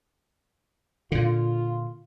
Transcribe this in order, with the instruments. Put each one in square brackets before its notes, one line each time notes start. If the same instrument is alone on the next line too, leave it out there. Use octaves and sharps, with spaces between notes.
[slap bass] A#2 D3 [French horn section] F4